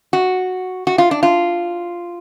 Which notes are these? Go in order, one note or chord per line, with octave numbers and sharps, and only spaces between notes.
F#4
F#4
F4
D4
F4